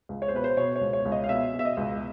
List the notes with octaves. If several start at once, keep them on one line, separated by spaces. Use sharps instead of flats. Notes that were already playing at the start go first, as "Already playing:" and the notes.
C#2
C#5
C5
B2 B4
C5
B2 C#5
C#5
C#2
C#5
C#2
D#5
F5
B2 E5
B2
E5
D#5
C#2